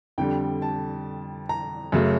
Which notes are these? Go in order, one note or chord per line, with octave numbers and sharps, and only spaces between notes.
F2 D3 G3 G5
A5
A#5
F#2 C#3 F#3 A3